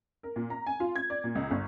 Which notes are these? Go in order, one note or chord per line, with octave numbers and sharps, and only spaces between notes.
A#4
A#2
A#5
G#5
F4
G#6
D5
A#2
C#2
G1